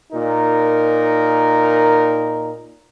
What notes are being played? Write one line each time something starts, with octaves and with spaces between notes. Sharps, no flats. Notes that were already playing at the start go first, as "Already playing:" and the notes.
A#2 D#4 A#4